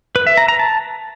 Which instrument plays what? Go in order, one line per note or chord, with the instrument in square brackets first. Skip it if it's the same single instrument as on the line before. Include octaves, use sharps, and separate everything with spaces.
[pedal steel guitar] B4
E5
A#5
A#5
A5